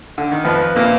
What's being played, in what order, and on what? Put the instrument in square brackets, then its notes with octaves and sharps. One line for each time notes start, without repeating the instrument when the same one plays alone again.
[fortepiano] D3
D#3
[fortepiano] F2 F3 [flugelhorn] B4
[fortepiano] A#2 A#3